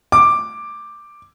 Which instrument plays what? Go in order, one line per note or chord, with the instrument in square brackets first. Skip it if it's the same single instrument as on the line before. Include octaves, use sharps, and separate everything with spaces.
[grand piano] D6